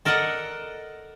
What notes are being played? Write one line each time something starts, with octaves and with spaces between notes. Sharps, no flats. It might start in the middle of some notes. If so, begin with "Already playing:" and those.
A4 A#4 D5 D#5 F#5